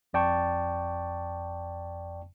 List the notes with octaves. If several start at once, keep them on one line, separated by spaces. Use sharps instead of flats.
G1 F2 D5 G5 A5 C#6